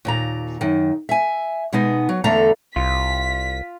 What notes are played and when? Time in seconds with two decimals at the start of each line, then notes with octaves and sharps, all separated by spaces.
0.05 D#2 A#2 A#5
0.61 F#2 D#3
1.09 E5 G#5
1.73 B2 G#3 B3 D#4
2.09 F#3
2.24 E2 D3 A3 A4 F5 A#5
2.76 C2 F4 B6